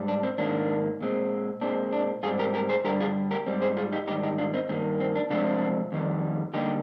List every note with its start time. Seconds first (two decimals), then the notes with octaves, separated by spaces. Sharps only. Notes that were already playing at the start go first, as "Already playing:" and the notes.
Already playing: G#2 G3
0.08 D4
0.23 C4
0.38 G#2 D#3 A#3 D4
1.01 A#2 G#3 C4
1.61 A#2 G#3 C4 D4
1.93 D4
2.23 G#2 G3 C4 F4 G#4
2.39 G4 A#4
2.54 G4 A#4
2.69 G#4 C5
2.85 G2 D3 G3 G4 A#4
3.00 F4 G#4
3.31 G4 A#4
3.46 G#2 G3 C4
3.61 G#4 C5
3.77 F4 G#4
3.92 D#4 G4
4.08 G#2 D#3 G3 D#4 G4
4.23 D#4 G4
4.38 D4 F4
4.54 C4 D#4
4.69 G2 D#3 G3 A#3 C4
5.00 C4
5.15 D4
5.30 C3 F3 G#3 C4 D4 F4
5.92 F2 D#3 G3
6.54 D3 G3 A#3 D#4 G4